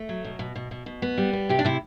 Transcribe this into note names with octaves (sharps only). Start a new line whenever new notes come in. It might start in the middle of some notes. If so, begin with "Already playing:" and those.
Already playing: A3
F#3
B2
B2
B2
B2
B2
B3
G3
B3
C3 G4
D4
C3 E4